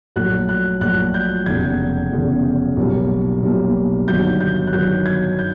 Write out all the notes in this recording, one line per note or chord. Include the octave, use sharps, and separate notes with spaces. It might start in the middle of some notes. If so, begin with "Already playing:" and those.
A#1 A#2 F#3 A3 F#6
F#6
A#1 A#2 F#3 A3 F#6
G6
F1 E2 C#3 G#6
F1 E2 C#3
B1 A#2 G3 A#3
B1 A#2 G3 A#3
G1 G2 D#3 F#3 G6
G6
F#6
G1 G2 D#3 F#3 G6
G#6
G6